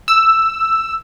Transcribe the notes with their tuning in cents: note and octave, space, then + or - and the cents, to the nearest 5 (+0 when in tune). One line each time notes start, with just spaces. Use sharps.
E6 +5